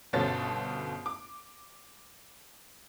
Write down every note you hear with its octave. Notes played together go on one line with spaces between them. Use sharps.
G1 B2 C#4 A4 C5 A6
D6